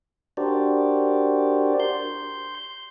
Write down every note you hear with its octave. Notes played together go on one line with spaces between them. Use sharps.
D4 F#4 G4 A#4 C5 D5
C6 G6